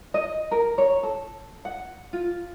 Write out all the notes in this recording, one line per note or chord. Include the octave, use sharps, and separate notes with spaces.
D#5
A#4
C#5
A4
F#5
F4